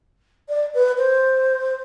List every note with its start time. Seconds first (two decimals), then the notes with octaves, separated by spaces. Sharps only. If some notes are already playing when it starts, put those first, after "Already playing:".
0.49 D5
0.74 B4
0.98 C5